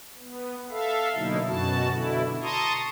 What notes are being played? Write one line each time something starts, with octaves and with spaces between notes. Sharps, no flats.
B3
A4 E5 F5
B2 D3 F#3 A#3 D#4 E4
F#2 B2 F#4 A5
B2 D3 E4
A5 A#5 C6 C#6 D#6